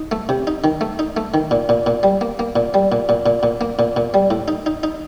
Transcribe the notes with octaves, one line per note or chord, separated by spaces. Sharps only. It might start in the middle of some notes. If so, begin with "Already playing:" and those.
Already playing: D#4
A3
C3
D#4
D#3
A3
D#4
A3
D#3
A#2
A#2
A#2
G3
A#3
A#3
A#2
G3
A#2
A#2
A#2
A#2
A#3
A#2
A#2
G3
A2
D#4
D#4
D#4